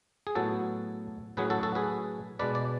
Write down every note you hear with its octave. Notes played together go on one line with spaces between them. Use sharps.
G#4
A2 F#3 B3 F#4 A4
A2 F#3 C#4 G#4 B4
F#4 A4
F#4 A4
G#4 B4
B2 G#3 D4 B4 D5
D5